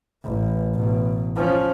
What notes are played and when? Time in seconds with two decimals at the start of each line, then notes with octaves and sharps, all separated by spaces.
0.25 A1
0.75 A1 B2
1.36 F3 C#4